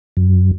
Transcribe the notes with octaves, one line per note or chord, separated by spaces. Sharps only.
F#2